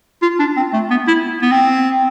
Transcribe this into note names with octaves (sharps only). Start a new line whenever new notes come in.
F4
D4
C4
A3
B3
E4
B3
C4